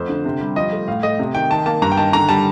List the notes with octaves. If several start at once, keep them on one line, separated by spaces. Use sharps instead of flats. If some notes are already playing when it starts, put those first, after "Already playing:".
Already playing: F2 A3 C5
D3
C3
G3
F3 D#5
A3
A2 F5
A3 D#5
C3
D#3 G5
D#3 A5
A#3 A5
G2 A#5
G5
D#3 A5
D3 A#5
G3 A5